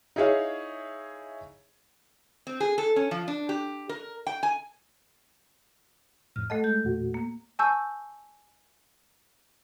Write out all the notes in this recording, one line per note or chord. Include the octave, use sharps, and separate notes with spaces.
D#4 E4 G#4 C#5 F5
C4
G#4
A4
C#4
F3
D4
G4
A#4
G5
G#5
F2 A2 F6
A3 A4 D#5 F#5 A5
G#3 G6
E2 A#2 F#4
A#3
G#5 A5 C#6 E6 G6